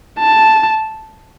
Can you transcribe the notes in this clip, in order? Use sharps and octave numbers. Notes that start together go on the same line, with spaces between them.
A5